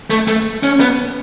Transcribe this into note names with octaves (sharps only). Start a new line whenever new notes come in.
A3
A3
C#4
B3